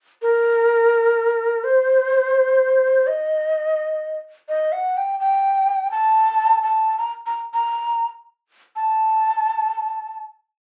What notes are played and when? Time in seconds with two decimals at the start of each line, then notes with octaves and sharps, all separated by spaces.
0.22 A#4
1.64 C5
3.07 D#5
4.49 D#5
4.72 F#5
4.97 G5
5.20 G5
5.91 A5
6.63 A5
6.98 A#5
7.26 A#5
7.54 A#5
8.76 A5